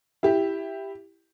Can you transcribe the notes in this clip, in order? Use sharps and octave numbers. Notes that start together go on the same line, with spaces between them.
E4 G4